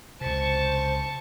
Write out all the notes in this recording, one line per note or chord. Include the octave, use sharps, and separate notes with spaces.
C#2 C3 C5 A5 C#6